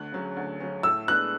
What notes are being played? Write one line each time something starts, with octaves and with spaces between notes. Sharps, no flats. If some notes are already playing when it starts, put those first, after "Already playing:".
Already playing: D2 F#6
C#3 F#3 C#4
D2
C#3 F#3 C#4
A2 E6
G#3 B3 D4 F#6